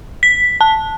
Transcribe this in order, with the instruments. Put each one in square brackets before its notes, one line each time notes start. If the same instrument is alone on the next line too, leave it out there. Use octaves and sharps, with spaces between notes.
[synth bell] B6
A5